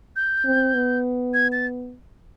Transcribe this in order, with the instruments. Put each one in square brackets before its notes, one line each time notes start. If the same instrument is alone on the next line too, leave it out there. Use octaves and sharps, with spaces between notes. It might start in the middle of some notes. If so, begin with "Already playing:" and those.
[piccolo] G6
[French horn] C4
B3
[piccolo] G#6
A6